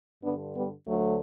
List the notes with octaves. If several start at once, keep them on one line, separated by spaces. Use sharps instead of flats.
G2 D3 B3 D4
G3 B3
D2 D3 F#3 A3